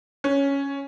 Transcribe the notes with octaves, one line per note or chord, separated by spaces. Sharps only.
C#4